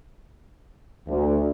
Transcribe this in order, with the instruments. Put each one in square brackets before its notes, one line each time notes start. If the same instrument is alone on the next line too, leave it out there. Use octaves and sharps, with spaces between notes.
[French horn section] D2